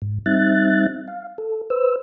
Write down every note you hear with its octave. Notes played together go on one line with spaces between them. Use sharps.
G#2
G3 C4 D#4 E5 F#6 A6
F5
A4
B4 C5 E6